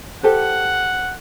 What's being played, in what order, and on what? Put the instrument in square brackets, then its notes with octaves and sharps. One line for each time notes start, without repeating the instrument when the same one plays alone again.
[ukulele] G4 A4 C5 [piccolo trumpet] F#5